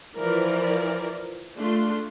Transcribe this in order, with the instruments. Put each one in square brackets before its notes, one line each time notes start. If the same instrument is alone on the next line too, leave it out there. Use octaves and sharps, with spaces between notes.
[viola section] E3 F3 A#4 D5
A3 D4 F4 C6